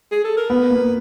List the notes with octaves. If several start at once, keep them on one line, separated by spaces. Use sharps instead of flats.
G#4
A4
A#4
B3 B4
A#3